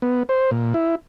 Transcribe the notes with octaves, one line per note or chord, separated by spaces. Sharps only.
B3
C5
A#2
E4